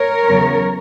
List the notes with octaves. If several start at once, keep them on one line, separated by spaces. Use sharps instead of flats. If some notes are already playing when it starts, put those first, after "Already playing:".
Already playing: A#4 C#5
E2 C#3 F#3 C#4